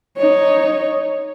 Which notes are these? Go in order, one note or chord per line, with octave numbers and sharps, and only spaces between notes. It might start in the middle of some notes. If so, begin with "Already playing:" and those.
D#4 C#5